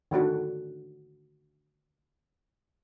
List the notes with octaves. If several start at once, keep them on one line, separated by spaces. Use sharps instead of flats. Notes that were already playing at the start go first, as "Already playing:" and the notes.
D3 D#3 D4 F#4